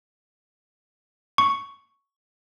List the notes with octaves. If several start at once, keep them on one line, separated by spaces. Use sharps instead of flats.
C#6